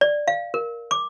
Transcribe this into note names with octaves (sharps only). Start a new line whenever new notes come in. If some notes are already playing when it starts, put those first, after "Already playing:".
D5
F5
A#4
D6